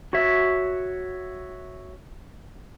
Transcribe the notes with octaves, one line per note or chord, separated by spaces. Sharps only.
F#4 C#5 E5